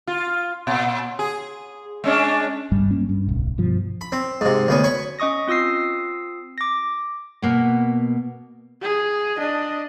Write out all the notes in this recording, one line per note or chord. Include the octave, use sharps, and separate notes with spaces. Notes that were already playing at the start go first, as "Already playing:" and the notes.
F4
A#2
G#4
G#3 C#4 D4
G1 G2 G3
G3 A#3 C#4
G2
D1 B1
G2 B2 F3
B5
C4
G#2 C3
D2 B3 C#4
C#5 B5 C#6
C#4 D#5 C#6 D#6 A#6
C4 F4 D#6 E6 C7
D6 A#6
B2 A#3 B3
G#4
D4 D#5